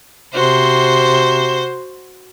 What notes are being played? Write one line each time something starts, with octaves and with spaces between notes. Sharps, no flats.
C3 F#4 C5 C6